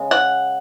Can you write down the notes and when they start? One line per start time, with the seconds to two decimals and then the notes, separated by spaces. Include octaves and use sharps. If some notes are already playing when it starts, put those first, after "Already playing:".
Already playing: C#3 G#3
0.11 F#5